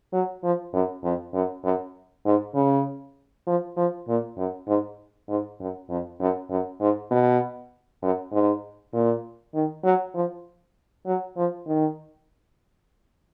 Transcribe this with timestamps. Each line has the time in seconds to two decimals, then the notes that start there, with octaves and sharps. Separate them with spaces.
0.13 F#3
0.43 F3
0.73 F#2
1.04 F2
1.34 F#2
1.64 F#2
2.26 G#2
2.55 C#3
3.47 F3
3.76 F3
4.08 A#2
4.37 F#2
4.68 G#2
5.29 G#2
5.60 F#2
5.90 F2
6.20 F#2
6.50 F#2
6.81 G#2
7.11 B2
8.02 F#2
8.32 G#2
8.93 A#2
9.54 D#3
9.84 F#3
10.14 F3
11.06 F#3
11.37 F3
11.67 D#3